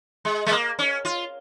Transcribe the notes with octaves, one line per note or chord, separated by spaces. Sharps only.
G#3
G#3
A#3
C#4
F4